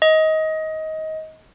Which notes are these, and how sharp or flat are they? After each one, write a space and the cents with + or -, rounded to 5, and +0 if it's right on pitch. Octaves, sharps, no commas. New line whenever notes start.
D#5 +20